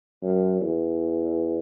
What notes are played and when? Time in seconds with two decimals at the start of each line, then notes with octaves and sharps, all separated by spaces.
0.22 F#2
0.61 E2